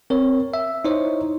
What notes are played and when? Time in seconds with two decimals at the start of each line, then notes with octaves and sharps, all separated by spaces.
0.10 C4 A#4 C#5
0.54 E5
0.85 D#4 E4 C5 C#5 D#5